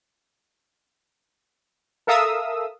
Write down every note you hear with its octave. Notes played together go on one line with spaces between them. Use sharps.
A4 A#4 E5 F5 D#6 E6